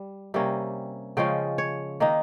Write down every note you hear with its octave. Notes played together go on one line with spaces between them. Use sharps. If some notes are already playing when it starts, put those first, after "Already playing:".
Already playing: G3
C3 G3 A#3 C#4
C#3 F3 G#3 C#4 G5
C#5
D#3 A#3 D#4